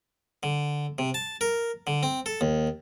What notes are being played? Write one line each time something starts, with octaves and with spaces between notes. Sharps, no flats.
D3
C3
A5
A#4
D3
C4
A4
D#2